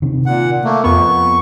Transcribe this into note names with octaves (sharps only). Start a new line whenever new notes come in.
C3 D#3
A#2 F#5
A3 A#3
F2 B3 C#6